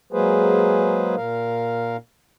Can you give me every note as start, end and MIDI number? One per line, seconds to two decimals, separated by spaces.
0.13 1.15 54
0.13 1.15 56
0.13 1.15 58
0.13 1.15 68
0.13 1.15 71
0.13 1.15 72
1.16 1.97 46
1.16 1.97 70
1.16 1.97 77